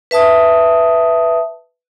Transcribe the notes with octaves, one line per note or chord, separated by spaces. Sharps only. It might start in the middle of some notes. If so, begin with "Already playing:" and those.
B4 E5 A5 D#6